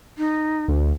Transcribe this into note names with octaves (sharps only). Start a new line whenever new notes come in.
D#4
D2